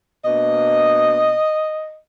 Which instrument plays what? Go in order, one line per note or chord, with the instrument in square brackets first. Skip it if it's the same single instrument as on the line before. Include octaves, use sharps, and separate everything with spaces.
[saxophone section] B2 A#3 D4 D#5